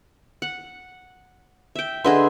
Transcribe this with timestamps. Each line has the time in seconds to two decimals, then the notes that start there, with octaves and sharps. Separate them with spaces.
0.42 F#5
1.76 E5 G5
2.04 D3 G#4 B4 D#5 E5 C6